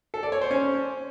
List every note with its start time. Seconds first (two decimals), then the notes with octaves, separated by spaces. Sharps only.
0.14 A4
0.23 D5
0.32 C#5
0.41 C5
0.51 C#4